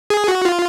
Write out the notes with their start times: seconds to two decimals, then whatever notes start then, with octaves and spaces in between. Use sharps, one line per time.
0.10 G#4
0.28 F#4
0.45 F4